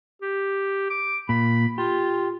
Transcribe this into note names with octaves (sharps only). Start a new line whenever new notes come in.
G4
D6
A#2 B5
F4 G4